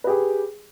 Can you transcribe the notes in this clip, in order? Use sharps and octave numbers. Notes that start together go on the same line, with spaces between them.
G4 G#4 B4